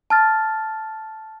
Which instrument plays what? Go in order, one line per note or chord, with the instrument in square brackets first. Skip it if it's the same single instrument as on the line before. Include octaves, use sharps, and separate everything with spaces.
[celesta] A5 F6 A6